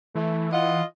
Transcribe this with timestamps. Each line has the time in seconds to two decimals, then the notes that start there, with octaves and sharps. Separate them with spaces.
0.15 E3 A3
0.53 F4 D#5 F#5